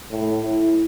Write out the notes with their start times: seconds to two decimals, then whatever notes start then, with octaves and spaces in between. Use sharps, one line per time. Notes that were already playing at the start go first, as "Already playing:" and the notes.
0.11 A2
0.41 E4